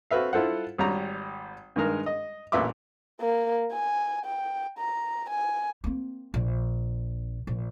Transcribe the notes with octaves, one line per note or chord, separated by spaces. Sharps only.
C4 F#4 A4 B4 E5 F5
E4 F4 A4 C5 F#5
G#1 G3 C#5 A#5
G2 D#3 G#3 A#4
D#5
A1 A#2 B4 E5 C6 D6
A#3
G#5
G5
A#5
G#5
A#3 C4
A#1
A#1